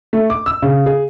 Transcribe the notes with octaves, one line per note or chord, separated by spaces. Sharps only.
A3
D6
E6
C#3
G#4